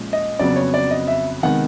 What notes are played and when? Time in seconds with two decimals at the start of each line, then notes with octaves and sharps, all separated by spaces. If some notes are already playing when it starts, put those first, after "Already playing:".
Already playing: A#2 F3 G#3 C#4
0.13 D#5
0.39 F2 C#3 F#3 B3 D5
0.56 C#5
0.74 D5
0.91 D#5
1.08 E5
1.43 C3 D#3 G#3 B3 F#5